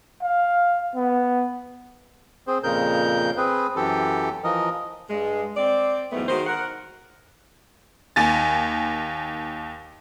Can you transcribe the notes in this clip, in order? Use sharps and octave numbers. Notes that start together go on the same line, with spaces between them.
F5
B3
C4 G#4 C5
F2 A#2 C#3 A#4 G6
C4 G#4 B4
F#2 E3 G4 A4
E3 F3 A#4 D#5
G2 G#3
C4 D5
E2 G#2 F#3 A3 B3
D#3 G#3 F#4 C5
A#4 F#5
D#2 G#5 A6